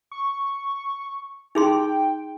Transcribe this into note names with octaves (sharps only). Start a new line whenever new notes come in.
C#6
D#4 G#4 G5 C6